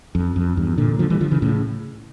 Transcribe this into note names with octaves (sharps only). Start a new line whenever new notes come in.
F2
F2
E2 G2
A#2 D3
D3 F3
E3 G3
D3 F3
C#3 E3
A2 C#3